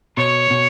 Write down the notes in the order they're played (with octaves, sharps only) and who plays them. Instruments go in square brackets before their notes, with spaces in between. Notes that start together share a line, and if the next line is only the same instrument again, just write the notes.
[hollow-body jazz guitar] B2 [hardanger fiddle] C#5
[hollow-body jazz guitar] B2